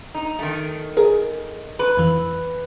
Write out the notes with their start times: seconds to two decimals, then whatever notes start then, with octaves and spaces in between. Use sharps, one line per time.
0.15 D#4
0.39 D#3 A3
0.97 G#4 A#4
1.79 B4
1.97 F2 E3